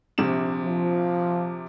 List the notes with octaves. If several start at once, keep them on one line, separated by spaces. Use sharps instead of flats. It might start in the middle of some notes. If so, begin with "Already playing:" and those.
A#1 C3 E7
F3